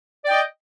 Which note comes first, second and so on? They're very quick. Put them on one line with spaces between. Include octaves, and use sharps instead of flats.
D5 G5 D#5